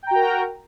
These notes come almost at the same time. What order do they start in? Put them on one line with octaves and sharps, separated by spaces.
G5 A#5 F#4 A#4